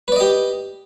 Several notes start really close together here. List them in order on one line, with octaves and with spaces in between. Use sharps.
B4 D5 D#5 G4